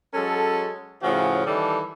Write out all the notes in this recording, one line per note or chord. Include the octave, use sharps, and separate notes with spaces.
F#3 G#3 C#4 A4
A2 C#3 F3 C#4 F#4
D#3 E3 G3 A4